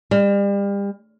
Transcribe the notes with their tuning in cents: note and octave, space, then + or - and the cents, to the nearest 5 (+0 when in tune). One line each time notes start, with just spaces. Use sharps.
G3 +35